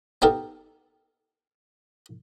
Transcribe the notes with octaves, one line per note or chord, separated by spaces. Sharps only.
B3 D#4 G4 A4 A#4